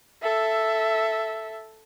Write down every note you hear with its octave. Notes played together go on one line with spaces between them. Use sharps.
A4 E5